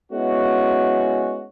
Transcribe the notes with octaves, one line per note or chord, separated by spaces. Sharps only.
G#3 B3 C#4 E4 F#4